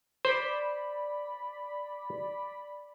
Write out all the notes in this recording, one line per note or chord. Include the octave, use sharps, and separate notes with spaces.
C5 D5 B5